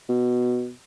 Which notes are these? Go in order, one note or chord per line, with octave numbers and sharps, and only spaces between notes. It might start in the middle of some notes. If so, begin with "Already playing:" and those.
B2